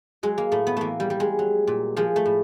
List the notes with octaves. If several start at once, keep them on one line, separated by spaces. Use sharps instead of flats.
F#3 G#3
A#3
A2 A3
B3
E3 A3 A#3
G3
G3
G#3
F#3
A#2
F3 G#3
A3
A2